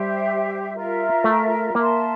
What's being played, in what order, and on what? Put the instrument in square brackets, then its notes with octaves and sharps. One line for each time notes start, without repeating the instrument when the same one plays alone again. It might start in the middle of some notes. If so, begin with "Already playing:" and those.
Already playing: [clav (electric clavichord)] G3 [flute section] G4 C5 E5
[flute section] F4 A#4 E5
[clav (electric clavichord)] A3
[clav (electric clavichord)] A#3 [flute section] A#4 E5 A5 C6